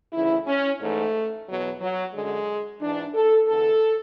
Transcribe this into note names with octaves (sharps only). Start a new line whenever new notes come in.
D2 C#3 E3 E4
C#4
G#2 E3 A3
E2 B2 F#3
F#3
F#2 D3 G#3
G#2 E3 D4
A4
E2 D3 A4